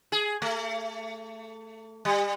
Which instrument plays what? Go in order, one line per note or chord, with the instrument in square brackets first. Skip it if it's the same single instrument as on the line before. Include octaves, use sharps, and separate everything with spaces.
[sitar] G#4
A3
G3